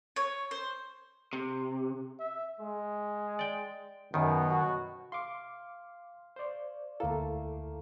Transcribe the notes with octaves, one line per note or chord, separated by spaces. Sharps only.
C#5
C5
C3
E5
G#3
D5 G5
F#2 B2 D#3 B3
F#4
F5 C6 D6
C5 D5
D2 A3 A#3 E4 A4